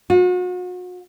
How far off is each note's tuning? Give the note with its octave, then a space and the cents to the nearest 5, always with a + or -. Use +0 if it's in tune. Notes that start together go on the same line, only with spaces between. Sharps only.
F#4 -40